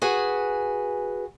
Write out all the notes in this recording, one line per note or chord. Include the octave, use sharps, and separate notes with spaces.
F#4 G#4 B4 G#5